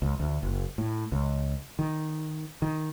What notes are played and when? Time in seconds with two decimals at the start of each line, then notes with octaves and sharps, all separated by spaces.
0.02 C#2
0.20 D2
0.43 F#1
0.78 A2
1.12 C#2
1.79 D#3
2.62 D#3